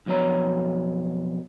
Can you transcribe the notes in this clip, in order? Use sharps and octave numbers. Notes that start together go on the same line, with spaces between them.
B1 F2 B2 C#5 A#5